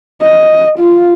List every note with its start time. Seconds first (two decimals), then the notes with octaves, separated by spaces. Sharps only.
0.22 D#5
0.79 F4